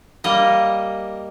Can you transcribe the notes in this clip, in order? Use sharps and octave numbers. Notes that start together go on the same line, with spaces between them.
G3 A#3 D#5